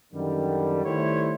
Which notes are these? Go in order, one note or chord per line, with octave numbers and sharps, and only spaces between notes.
F#2 D3 D#3 G3
D#3 G3 A3 E4 C5 C#5